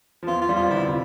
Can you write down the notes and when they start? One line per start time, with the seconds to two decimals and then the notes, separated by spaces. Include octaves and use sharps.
0.23 F3
0.27 E2 E3 F4
0.42 F4
0.49 G3
0.56 F2 F3 F4
0.70 D3 E4
0.85 C3